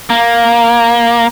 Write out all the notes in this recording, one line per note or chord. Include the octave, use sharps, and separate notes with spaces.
A#3